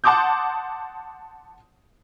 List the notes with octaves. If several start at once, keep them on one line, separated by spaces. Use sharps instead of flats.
F#5 A5 C6 D6 D#6 G6